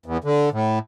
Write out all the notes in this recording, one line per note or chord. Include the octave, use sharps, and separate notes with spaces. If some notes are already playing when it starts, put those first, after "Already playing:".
E2
D3
A2